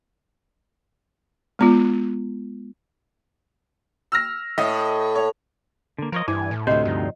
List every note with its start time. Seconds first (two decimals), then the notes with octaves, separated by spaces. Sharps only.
1.59 G#3 B3 F4
4.12 E6 F6 A#6
4.58 A2 D#5
5.15 C#5
5.98 D3 A#3
6.12 F3 A#4 C#5 D#5
6.28 G2 E3 E4 G#5
6.51 A2
6.67 D2 C3 C5 D#5
6.85 G2 F3 D#4